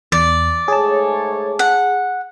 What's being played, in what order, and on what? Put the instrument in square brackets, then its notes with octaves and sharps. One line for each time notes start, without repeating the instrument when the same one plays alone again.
[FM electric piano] E2 [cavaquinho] D5
[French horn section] G#2 A3 C#5 [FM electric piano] G#4 A5
[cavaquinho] F#5